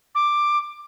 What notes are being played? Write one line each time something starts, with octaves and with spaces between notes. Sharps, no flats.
D6